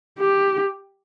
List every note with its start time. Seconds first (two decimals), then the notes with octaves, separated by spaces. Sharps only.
0.20 G4